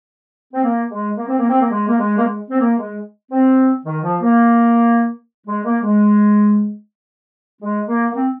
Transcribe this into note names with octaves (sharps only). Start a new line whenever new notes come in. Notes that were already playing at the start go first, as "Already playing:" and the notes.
C4
A#3
G#3
A#3
C4
A#3
C4
A#3
G#3
A#3
G#3
A#3
G#3
C4
A#3
G#3
C4
D#3
F3
A#3
G#3
A#3
G#3
G#3
A#3
A#3
C4